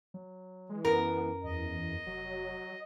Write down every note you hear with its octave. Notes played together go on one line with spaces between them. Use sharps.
F#3
E3 G#3
F#2 B3 A#4
E2 D#5
F1 F#3